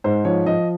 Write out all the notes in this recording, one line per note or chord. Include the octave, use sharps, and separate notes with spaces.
G#2 C5
F3 C#5
F3 D#5